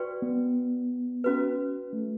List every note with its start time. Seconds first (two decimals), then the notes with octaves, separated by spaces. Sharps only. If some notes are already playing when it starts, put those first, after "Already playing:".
Already playing: F#4 B4 D5 G5 C#6
0.22 B3
1.24 C#4 F#4 B4
1.93 A3